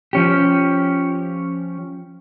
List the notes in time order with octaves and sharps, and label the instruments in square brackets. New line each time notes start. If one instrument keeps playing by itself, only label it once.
[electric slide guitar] F3 C#4 G4